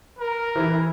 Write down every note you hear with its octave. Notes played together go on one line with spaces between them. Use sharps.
A#4
E3 E4